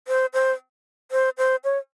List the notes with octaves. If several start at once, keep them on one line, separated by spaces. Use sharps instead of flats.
C5
C5
C5
C5
C#5